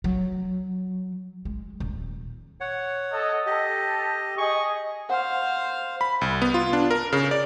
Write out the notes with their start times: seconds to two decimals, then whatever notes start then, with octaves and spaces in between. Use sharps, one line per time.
0.04 F#3
1.45 G#3
1.80 D#1
2.60 C#5 F#5
3.12 A4 D#5
3.46 G4 A4 D#5
4.38 G#4 D#5 C#6
5.10 C5 F5 F#5
6.01 B5
6.21 C2
6.42 B3
6.54 F4
6.73 D4
6.91 A#4
7.13 C#3
7.31 D5